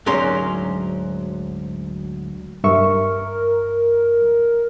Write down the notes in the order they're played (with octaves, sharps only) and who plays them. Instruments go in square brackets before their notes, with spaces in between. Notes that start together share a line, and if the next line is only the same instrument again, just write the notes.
[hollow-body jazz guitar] D2 G#2 F#3 C#4 A#4 C6
[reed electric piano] G2 E5 C#6 [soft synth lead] A#4